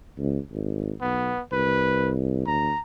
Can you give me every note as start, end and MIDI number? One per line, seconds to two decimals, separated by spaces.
0.18 0.38 37
0.51 0.92 32
1.01 1.33 35
1.01 1.41 59
1.52 2.43 36
1.52 2.12 71
2.47 2.72 38
2.47 2.81 82